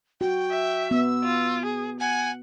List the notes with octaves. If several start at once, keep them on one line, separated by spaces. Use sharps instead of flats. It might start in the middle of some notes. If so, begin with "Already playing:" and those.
F#4 G5
E5
B3 E6
F4
G#4
F#5 G#5